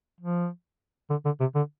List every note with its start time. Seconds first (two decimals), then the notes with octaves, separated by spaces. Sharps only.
0.21 F3
1.10 D3
1.25 D3
1.41 C3
1.55 D3